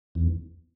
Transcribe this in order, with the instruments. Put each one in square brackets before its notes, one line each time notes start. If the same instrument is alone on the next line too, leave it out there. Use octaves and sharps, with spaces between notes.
[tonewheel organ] E2